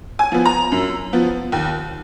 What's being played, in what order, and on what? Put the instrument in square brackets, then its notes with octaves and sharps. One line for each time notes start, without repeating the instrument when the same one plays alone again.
[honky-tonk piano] G#5
F3 B3
A#5
F#2
F3 B3
D#2